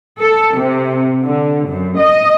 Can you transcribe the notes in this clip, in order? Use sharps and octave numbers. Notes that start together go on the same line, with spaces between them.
A4
C3
D3
F#2
D#5